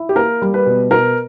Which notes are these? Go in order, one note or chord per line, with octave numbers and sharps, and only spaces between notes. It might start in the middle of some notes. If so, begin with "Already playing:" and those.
Already playing: E4
G4
A#3 A#4
G3
B4
B2
B2 A#4